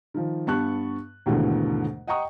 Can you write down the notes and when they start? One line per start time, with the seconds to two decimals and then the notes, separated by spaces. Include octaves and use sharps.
0.14 D#3 F3
0.47 G2 B3 A5 C#6 F#6
1.26 D#2 G#2 B2 D3 E3 A3
2.07 D#5 F#5 G5 A#5 C#6 D#6